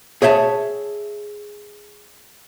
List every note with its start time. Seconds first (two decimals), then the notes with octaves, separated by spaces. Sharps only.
0.22 G#4 C#5 E5 G5 A5